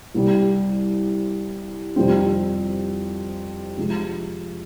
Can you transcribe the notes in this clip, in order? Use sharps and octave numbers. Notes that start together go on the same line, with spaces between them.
C2 C3 G3
F2 C3 G3 C4
C3 F3 G#3